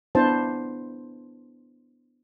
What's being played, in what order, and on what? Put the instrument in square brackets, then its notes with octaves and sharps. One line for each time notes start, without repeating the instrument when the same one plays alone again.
[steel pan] B3 D4 E4 C5 A5